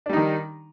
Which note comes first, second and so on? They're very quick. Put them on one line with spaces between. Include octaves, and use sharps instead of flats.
D4 G3 D#4 D#3